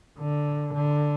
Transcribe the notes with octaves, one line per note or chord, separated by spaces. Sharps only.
D3
D3